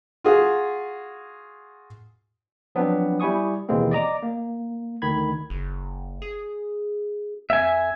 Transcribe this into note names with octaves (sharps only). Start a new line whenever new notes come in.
F4 F#4 G#4
F3 F#3 B3 C4 D4
G3 E4 G#5 C#6 D#6
D#2 B2 E3 G#3 A#3 C4
D5 D#5 A#5 D6
A#3
D2 D#3 B5 G#6
F#1
G#4
F2 E5 G#5